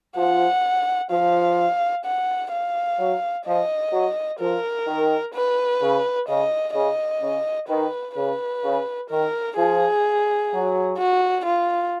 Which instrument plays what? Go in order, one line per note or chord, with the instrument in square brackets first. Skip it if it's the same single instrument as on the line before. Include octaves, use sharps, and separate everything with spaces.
[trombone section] F3 [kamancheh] F#5
[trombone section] F3 [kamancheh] F5
[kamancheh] F#5
F5
[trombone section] F#3
[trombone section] F3 [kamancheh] D#5
[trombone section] F#3
[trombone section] F3 [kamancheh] A#4
[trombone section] D#3
[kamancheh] B4
[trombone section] C#3
[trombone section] C#3 [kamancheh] D#5
[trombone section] C#3 [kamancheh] D#5
[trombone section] C#3
[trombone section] D#3 [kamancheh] B4
[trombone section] C#3 [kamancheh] B4
[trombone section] C#3
[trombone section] D#3 [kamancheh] A#4
[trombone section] F3 [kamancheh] G#4
[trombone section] F#3
[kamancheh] F#4
F4